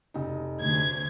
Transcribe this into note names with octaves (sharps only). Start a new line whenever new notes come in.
F1 D#4
D2 G#6